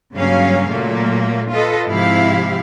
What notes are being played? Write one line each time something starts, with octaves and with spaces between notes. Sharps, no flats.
G2 C#3 F#3 A#3 C#4 F5
A#2 F#3 A3 A#3
F4 A4 B4 D#5
G#2 C3 F3 E4 G4 F5